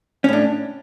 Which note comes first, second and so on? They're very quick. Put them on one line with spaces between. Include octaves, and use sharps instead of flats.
C#4 A2 D4